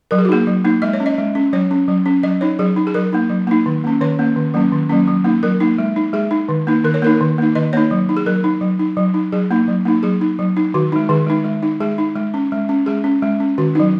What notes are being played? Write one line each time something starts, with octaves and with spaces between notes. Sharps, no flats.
F#3 A#4
G#4
F#4
A#3 D#4 G#4
F#3
A#3 D#4
G#3 D#5
C#5
C#4
D#5
G#3
C#4
F#3 C#5
C#4
F#3
C#4
F#3 D#5
D#4 C#5
F#3 G#4
D#4
G#4
F#3 A#4
A#3 D#4
F#3
A#3 D#4
D#3
A#3 C#4
D#3 C#5
A#3 C#4
D#3
F#3 A#3 C#4
D#3
F#3 A#3 C#4
F#3
A#3 D#4
F#3 A#4
A#3 D#4
G#3
D#4
G#3 G#4
D#4
D#3
A#3 D#4
D#3 A#4
C#5
A#3 D#4 A#4
D#3
A#3 D#4
D#3 D#5
A#3 D#4 C#5
F#3
D#4
G#4
F#3 A#4
D#4
F#3
D#4
F#3
D#4
F#3 G#4
A#3 D#4
F#3
A#3 D#4
F#3 G#4
D#4
F#3
D#4
D#3 F#4
G#3 D#4
D#3 G#4
G#3 D#4
G#3
D#4
G#3 G#4
D#4
G#3
C#4
G#3
C#4
G#3 G#4
C#4
G#3
C#4
D#3 F#4
F#3 D#4